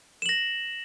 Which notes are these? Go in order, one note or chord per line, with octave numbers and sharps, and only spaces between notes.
A#6 E7 F#7